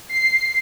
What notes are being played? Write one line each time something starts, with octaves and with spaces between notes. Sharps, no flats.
C7